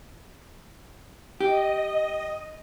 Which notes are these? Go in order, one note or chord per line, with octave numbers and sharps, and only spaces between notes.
G4 D#5